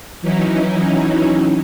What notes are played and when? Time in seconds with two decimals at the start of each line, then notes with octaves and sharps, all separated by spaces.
0.21 E3 F#3 C#4 D#4 E4